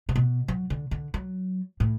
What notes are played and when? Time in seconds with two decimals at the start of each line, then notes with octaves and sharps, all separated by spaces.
0.09 C3
0.16 B2
0.48 F#3
0.70 D3
0.91 D3
1.14 F#3
1.80 A2